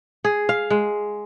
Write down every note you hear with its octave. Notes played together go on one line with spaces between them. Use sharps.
G#4
F5
G#3